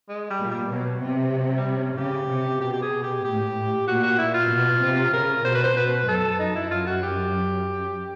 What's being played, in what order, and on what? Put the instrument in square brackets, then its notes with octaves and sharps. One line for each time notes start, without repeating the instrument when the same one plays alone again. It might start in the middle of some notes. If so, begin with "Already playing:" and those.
[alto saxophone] G#3
G3
[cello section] A#2
[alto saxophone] G3
[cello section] B2 [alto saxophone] F#3
[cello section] C3
[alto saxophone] F#3
F#3
G3
C#4
[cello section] C#3 [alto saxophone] G4
[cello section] C3
[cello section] B2 [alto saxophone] G4
[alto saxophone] G4
G#4
G4
[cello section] A2 [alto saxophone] G4
[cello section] A#2 [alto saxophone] F#4
[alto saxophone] F#4
E4
F4
[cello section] B2
C3
[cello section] C#3 [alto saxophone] A#4
[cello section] B2 [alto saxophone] C5
[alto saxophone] B4
C5
[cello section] B2 [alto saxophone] B4
[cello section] F#2 [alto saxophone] A4
[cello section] F#2 [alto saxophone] D#4
[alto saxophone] E4
F4
F#4
G4